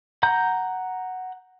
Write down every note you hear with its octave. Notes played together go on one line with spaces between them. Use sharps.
F#5 A#5 G6